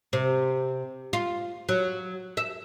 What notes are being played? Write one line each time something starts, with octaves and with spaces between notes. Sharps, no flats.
C3
F4
F#3
E5